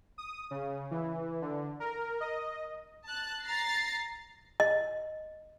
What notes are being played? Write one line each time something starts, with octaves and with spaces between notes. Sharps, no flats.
D#6
C#3
E3
D3
A#4
D#5
A5 F#6
A#5 A6 C7
D#5